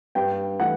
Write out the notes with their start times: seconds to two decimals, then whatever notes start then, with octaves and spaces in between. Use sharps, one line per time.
0.15 G2 G5
0.60 E3 A3 F#5